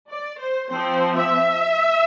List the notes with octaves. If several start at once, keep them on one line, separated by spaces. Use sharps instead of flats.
D5
C5
F3 C4 C5
E5